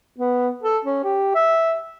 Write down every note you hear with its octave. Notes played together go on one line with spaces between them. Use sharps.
B3
A4
C#4
G4
E5